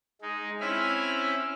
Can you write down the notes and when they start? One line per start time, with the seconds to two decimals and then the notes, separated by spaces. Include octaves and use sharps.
0.22 G#3 D#4
0.61 C4 C#4 E4 E5 B5 F6